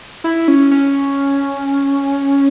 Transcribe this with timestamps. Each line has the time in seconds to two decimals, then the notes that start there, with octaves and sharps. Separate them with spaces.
0.24 E4
0.48 C#4
0.71 C#4